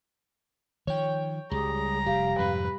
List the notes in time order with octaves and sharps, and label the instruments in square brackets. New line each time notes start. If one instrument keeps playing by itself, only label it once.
[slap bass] D#3 F3 [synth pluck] C#5 G5
[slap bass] C#2 [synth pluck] G3 [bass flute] G#4 [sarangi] A#5
[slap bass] F1 [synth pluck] G4 [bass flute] F5
[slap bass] F2 G#2 C3 [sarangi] B4